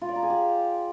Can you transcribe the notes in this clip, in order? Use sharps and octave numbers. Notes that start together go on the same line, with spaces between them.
F4
D5
A#5
G#4
G4